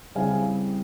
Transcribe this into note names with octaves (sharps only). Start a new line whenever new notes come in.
C#3 G3 C4 E4 F5 G#5